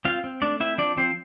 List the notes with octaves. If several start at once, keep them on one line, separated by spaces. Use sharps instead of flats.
C4 F4 F5
C4
A3 D4 D5
C4 E4 E5
F3 D4 D5
F3 C4 C5